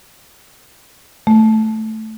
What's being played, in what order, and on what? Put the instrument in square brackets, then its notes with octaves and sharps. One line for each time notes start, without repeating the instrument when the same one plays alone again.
[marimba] A3